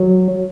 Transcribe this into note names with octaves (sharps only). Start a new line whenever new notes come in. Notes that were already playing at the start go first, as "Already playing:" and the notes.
Already playing: F#3